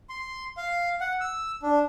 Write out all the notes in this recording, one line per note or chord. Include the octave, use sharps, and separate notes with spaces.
C6
F5
F#5
E6
D4